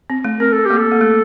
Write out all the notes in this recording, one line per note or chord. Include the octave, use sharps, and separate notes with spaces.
C4
A3
C4 A#4
A4
A#3 G4
A4
A#3
A3